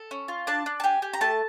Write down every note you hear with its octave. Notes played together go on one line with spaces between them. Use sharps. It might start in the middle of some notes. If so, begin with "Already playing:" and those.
Already playing: A4
C#4
F4
D4 A5
D4
A5
G4 G#5
G4
A#5
A3 A5